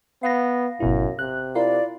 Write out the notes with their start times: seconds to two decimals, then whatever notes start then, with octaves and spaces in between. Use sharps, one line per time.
0.23 B3 F5 A#6
0.80 G#1 F#2 B2 E4
1.19 C3 F#6
1.55 E4 F4 A#4 D5 F5